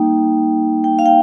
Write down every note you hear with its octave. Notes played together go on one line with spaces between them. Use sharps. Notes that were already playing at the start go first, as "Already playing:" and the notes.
Already playing: G3 A#3 D#4 G5
G5
F5
G5